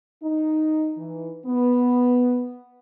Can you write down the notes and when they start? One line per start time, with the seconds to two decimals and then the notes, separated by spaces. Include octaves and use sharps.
0.23 D#4
0.97 E3
1.46 B3